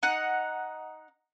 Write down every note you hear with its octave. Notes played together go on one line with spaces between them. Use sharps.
D#4 F#5